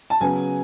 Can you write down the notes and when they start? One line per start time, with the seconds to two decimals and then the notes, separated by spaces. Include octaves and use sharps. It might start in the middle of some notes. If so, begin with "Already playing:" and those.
0.10 A5
0.20 C#3 F#3 B3 G#5